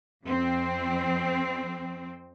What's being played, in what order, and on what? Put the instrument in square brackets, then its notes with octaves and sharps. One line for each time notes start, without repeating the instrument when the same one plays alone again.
[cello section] F2 C4